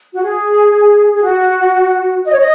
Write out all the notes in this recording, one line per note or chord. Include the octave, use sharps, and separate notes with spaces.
F#4
G#4
G#4
F#4
D#5
C#5
D#5